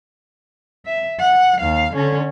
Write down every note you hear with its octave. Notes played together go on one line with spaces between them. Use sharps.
E5
F#5
D#2 F5
D3 C#4